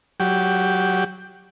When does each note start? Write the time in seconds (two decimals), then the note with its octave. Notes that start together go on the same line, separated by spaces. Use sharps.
0.20 F#3 G4